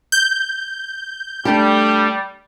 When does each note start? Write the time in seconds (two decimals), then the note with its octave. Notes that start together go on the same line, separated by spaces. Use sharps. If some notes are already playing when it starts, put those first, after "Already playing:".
0.12 G6
1.45 G3 A3 D4 G4